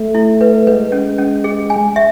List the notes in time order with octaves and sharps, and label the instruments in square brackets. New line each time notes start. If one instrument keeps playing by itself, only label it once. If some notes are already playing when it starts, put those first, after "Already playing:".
Already playing: [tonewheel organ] A3
[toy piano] E4
B4
[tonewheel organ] G#3 [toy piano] B4
[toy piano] C#4
C#4
G#4
G#5
E5